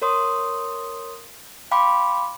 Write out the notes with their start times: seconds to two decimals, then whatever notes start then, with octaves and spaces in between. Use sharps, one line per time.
0.02 A#4 C#5 C6 D#6
1.71 F5 G5 B5 C6 D6